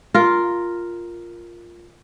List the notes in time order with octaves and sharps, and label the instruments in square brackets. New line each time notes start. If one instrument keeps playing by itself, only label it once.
[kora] F4 A#4